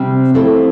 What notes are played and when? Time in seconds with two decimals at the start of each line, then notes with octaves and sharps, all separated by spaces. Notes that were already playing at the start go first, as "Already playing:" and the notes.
Already playing: C3 G3 C4
0.34 F3 A3 C4 E4 A4